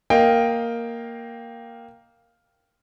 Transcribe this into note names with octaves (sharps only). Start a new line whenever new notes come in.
A#3 D#5 F5 G5